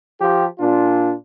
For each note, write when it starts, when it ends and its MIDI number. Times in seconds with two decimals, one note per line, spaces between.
0.21 0.45 53
0.21 0.45 67
0.59 1.14 46
0.59 1.14 62
0.59 1.14 65